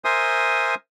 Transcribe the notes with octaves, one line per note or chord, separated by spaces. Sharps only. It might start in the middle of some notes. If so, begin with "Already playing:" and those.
A#4 C5 E5 G#5 C6 D#6